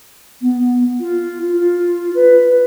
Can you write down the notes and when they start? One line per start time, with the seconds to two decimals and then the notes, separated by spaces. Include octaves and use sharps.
0.41 B3
1.00 F4
1.53 F4
2.15 B4